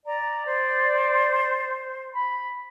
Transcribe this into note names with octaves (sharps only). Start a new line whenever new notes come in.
D5 A#5
C5
B5